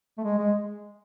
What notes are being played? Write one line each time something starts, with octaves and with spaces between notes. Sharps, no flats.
A3
G#3
G#3